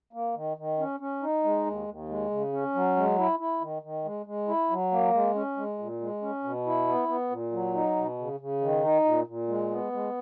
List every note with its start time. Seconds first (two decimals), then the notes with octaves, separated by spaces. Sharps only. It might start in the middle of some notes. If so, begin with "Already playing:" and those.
0.13 A#3
0.35 D#3
0.57 D#3
0.79 C#4
1.00 C#4
1.23 D#4
1.44 G#3
1.66 D#2
1.88 D#2
2.09 G#3
2.30 C#3
2.53 C#4
2.75 F#3
2.96 G#3
3.18 E4
3.39 E4
3.61 D#3
3.82 D#3
4.05 G#3
4.26 G#3
4.48 E4
4.70 F#3
4.92 A#3
5.13 G#3
5.35 C#4
5.57 G#3
5.79 A#2
6.01 G#3
6.22 C#4
6.44 B2
6.66 E4
6.88 B3
7.08 B3
7.30 A#2
7.52 F#3
7.74 D#4
7.96 B2
8.18 C#3
8.40 C#3
8.61 D#3
8.84 D#4
9.04 A#2
9.27 A#2
9.48 G#3
9.71 B3
9.92 G#3